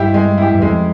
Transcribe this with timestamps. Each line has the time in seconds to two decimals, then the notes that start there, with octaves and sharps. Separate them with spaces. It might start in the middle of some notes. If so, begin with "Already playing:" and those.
Already playing: G2 G#3 E4 G4
0.14 G#3
0.38 E4 G4
0.54 G2
0.62 F2 G#3